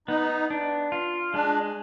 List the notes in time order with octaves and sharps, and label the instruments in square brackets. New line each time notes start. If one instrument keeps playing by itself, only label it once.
[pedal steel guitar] B3 [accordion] D#4
[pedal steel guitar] D4
F4
[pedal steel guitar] G#3 [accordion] D4